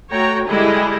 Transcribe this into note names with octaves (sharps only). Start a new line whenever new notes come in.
A3 F#4 C#5 G5 A#5
D3 G3 G#3 E4 G#4 D#5